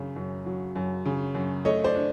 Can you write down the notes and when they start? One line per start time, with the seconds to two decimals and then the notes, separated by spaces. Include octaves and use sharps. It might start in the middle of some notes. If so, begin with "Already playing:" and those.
Already playing: F#2 C#3
0.16 F#2
0.46 F#3
0.76 F#2
1.05 C#3
1.35 F#2
1.65 A3 C#5 D#5
1.84 C5 D5
1.95 D4